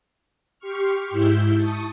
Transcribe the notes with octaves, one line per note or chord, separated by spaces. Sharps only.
G4 C6 C#6 F6
G#2 E4 E6 G6
A5 C#6 D#6